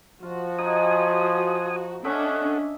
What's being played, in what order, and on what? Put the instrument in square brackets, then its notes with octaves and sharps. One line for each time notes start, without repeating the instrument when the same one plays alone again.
[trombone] F3 [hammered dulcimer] F4 [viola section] F#4
[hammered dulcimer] D#4 [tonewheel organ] G#5 D#6
[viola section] C#4 D4 [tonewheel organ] A4 F#5 [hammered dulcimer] D#5 E5